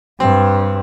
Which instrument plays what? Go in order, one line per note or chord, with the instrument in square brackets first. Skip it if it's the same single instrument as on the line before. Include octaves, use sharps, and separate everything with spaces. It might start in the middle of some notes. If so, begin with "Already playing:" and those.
[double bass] G2 [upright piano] C4